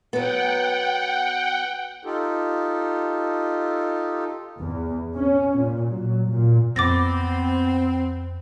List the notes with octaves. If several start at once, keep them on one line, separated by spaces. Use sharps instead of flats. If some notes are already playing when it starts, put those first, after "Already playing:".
F#3 B3 F#5 G5
D#4 F4 G4 A4
E2
C#4
A#2
F#3
A#2
F2 B3 C4 D6 A6 A#6